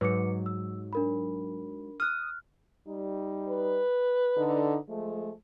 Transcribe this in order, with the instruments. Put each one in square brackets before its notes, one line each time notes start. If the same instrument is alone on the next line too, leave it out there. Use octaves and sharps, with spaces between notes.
[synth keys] G#2 F#3 [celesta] B4 D6 C#7
[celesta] E6
D4 A#4 B5
[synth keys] D#6 [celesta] F6 F#6
[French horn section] G3 D#4
[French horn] B4
[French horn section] D3 D#4
F3 G#3 A3